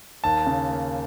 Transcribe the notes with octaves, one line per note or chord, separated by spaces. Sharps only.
D#2 A5
C#3
A#3